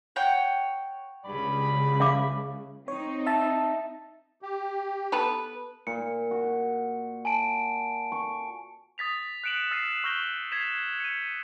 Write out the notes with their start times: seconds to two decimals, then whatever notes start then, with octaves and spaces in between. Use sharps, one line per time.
0.16 C#5 F#5 G5
1.25 C#2 G2 C#3 D5 B5
2.00 E5 F5 D6
2.88 C4 D#4 C#5
3.26 E5 A5
4.42 G4
5.12 B3 A4 B4
5.87 A#2 C#7
6.31 F#4
7.25 G#5 A5 D7
8.12 C#6
8.98 D#6 A6 B6 F7
9.44 F#6 C#7 D7 E7 F#7
9.71 E6 F6 A6 C7 D#7 E7
10.04 C#6 E6 F6 G6 A#6 G7
10.52 G#6 A6 B6 C7 E7 F7
11.00 C#7 D#7